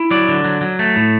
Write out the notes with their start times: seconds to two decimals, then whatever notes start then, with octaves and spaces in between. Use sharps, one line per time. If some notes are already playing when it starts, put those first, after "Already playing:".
Already playing: E4
0.11 F#3 D5
0.28 D3
0.44 F#3
0.61 F#3
0.79 A3
0.96 A2